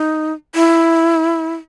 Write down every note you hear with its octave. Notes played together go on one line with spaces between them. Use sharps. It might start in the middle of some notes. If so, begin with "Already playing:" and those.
Already playing: D#4
E4